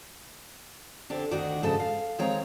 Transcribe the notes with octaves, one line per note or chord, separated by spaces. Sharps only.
D3 C4 D4 G4
D2 D#3 D4 D#4 F#4 D5
G#2 C#3 A4 D#5 A5
F5
D#3 G#3 C4 C#5 F5 A#5